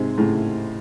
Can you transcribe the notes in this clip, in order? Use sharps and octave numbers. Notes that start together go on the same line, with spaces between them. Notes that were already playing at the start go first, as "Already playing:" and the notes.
Already playing: G#2 C3
A2 C#3